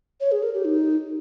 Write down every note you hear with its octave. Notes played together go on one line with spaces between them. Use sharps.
C#5
G#4
A#4
G4
D#4